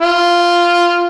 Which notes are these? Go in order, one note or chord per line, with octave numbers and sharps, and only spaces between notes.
F4